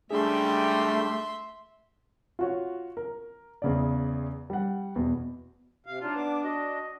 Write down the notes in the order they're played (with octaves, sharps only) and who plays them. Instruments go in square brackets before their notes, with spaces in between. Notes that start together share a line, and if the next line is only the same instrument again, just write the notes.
[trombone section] C#2 G3 [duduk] A3 [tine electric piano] D4 G#4 [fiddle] E5 C6
[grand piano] F4 F#4 C#5
A#4
E2 C#3 D5
G3 F#5
E2 B2
[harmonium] C3 F5
[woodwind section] F#3 D#4 F4 [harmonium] D4
[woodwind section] B3 D6
F#4 D#5